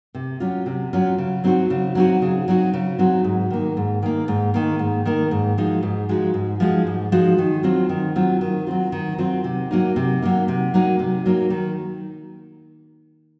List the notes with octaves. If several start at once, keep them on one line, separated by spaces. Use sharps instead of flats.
C3
F#3 C#4 F4
C3
F#3 C#4 F4
C#3
F#3 C4 D#4 F#4
C#3
F#3 C4 D#4 F#4
C#3
F#3 C4 D#4 F#4
C#3
F#3 C4 D#4 F#4
G#2
D#3 A#3
G#2
D#3 A#3
G#2
D#3 A#3
G#2
D#3 A#3
G#2
F3 G#3 D#4 F#4
G#2
F3 G#3 D#4 F#4
G#2
F3 G#3 D#4 F#4
G#2
F3 G#3 D#4 F#4
D#3
F#3 C4 F4
D#3
F#3 C4 F4
D#3
F#3 C4 F4
D#3
F#3 C4 F4
C3
F#3 A#3 D#4
C3
F#3 A#3 D#4
C3
F#3 A#3 D#4
C3
F#3 A#3 D#4
D#3